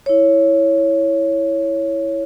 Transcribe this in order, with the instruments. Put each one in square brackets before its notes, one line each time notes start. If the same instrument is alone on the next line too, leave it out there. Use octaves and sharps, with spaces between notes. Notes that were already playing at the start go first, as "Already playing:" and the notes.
[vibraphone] E4 C#5